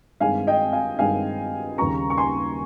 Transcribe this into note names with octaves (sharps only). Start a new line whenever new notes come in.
G2 D#3 G#3 C4 F5 G#5
D#5 G5
F5 G#5
G2 D#3 G#3 C4 F5 G#5
D#2 C#3 G3 C#4 A#5 C#6
C#6
G#5 C6